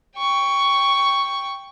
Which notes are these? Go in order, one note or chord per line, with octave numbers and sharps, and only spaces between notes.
G5 C#6